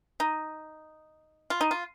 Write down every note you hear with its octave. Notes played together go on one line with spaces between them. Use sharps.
D#4
F4
D#4
F4